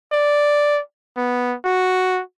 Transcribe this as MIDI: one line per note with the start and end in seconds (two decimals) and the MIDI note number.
0.12 0.81 74
1.17 1.55 59
1.64 2.21 66